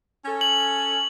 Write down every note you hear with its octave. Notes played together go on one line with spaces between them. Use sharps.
C#4 A4
F#7